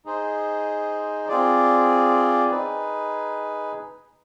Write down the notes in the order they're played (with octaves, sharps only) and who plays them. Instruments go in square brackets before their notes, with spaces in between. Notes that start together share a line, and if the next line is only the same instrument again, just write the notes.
[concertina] D#4 G#4 C5
C4 F4 G#4 D5
D#4 G#4 B4